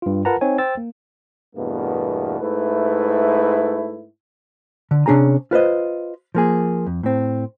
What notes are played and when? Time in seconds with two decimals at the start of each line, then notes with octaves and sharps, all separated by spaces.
0.02 G2 F4
0.25 F4 A#4 B4 F#5 A5 A#5
0.41 C4 D#4 C#5 G#5
0.58 C5 G5 E6 A6
0.77 A#3
1.56 E2 G2 B2 A3 A#3
2.40 G#2 A3 E4 B4
4.91 D3
5.06 C3 C#4 D4 G#4 G#5 A#5
5.51 F4 B4 C5 D#5
6.35 F3 A#3 G#4
6.87 F2
7.03 A2 C4